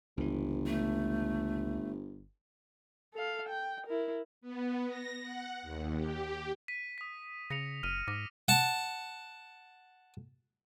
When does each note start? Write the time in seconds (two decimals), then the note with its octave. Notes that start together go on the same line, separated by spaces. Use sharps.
0.17 G1 C#2 E3
0.67 A3
3.14 A4 F5
3.49 G5
3.86 E4 A#4
4.41 B3
4.88 A#6
5.21 F#5
5.62 D#2
5.96 G4
6.68 B6 D#7
6.98 D#6 B6
7.50 C#3 A#6 C#7 F7
7.83 F#1 F6 D#7
8.07 G#2 D6 A#6 D#7
8.48 F#5 A5